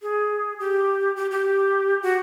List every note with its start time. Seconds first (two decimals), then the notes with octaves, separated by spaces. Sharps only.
0.02 G#4
0.59 G4
1.16 G4
1.31 G4
2.03 F#4